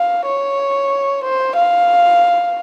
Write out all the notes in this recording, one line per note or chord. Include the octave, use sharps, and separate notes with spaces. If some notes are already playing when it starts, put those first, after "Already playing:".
Already playing: F5
C#5
C5
F5